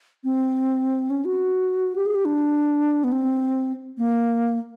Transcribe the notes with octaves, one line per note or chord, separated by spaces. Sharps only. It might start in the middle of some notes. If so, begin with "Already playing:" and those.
C4
C#4
F#4
G4
G#4
G4
D4
B3
C4
A#3